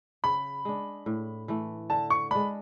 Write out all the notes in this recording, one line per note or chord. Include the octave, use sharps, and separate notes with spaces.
C#3 B5
G#3 D4
A2
E3 A3
D3 A5
C#6
G#3 D4 B5